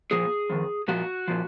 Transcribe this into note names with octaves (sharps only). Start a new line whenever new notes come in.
A#2 F3 G#4
F2 D#3
A#2 F3 F#4
A#2 F3